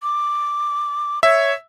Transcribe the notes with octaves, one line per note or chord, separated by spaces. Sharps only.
D6
C#5 E5